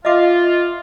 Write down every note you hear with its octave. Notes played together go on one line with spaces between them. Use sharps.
F4 D#5 E5 D6